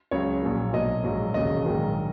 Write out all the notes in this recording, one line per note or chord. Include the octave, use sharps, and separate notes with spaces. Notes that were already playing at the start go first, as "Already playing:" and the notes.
C#2 C#3 F#3 C#5
A#1 A#2 F#3
B1 A#2 F#3 D#5
A#1 G#2 F#3
E1 D#2 C#3 F#3 D#5
A#1 G#2 D#3 F#3